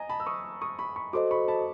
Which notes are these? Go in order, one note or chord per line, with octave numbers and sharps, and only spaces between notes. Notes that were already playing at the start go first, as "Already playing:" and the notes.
Already playing: D#5 G#5 A#5
A5 B5
E6
C#6 D#6
C#6 D#6
B5 C#6
B5 C#6
F#4 A4 C5 D#5 C6 D6
B5 C#6
A5 B5